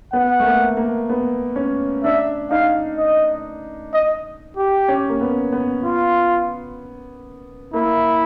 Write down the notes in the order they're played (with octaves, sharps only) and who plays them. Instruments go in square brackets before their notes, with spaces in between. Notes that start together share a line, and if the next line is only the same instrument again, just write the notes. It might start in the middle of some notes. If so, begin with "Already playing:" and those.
[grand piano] B3 [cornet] F#5
[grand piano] A3
A#3
A#3
B3
C#4
[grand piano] D4 [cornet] E5
[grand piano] D#4 [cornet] F5
[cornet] D#5
D#5
G4
[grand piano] C#4
A#3
B3
B3
[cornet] F4
[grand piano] A#3 [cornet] E4